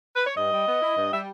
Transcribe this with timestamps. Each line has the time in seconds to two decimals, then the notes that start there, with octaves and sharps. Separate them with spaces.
0.16 B4
0.26 C#5
0.36 G2 D#5
0.52 G3
0.67 B3
0.81 E4
0.97 G2
1.12 G3 E5